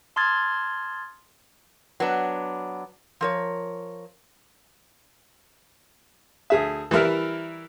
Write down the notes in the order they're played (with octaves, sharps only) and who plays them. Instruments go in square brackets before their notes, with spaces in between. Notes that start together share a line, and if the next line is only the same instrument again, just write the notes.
[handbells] A5 C6 D#6 F6 G#6 A6
[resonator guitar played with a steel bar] F#3 B3 D4
F3 A#4 C#5
[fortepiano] D2 G#4 E5
E3 G3 E4 A#4